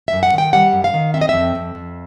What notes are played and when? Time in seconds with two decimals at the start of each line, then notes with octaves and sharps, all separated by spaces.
0.08 E5
0.13 F#2
0.23 F#5
0.33 D#3 G5
0.53 G3 F#5
0.73 F#2
0.84 F5
0.94 D#3
1.14 C4 E5
1.21 D#5
1.29 F2 E5
1.55 F2
1.75 F2